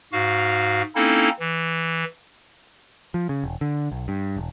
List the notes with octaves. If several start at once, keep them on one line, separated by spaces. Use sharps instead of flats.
G#2 F#4 F5 F6
A#3 C4 C#4 D#4 E4 A4
E3
F3
C#3
E1
D3
B1
G2
E1